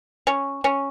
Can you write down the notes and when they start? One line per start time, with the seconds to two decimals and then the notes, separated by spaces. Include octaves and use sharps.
0.27 C#4
0.64 C#4